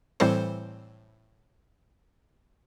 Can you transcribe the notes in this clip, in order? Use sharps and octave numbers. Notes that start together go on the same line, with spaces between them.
A2 E3 G3 C4 A4 C5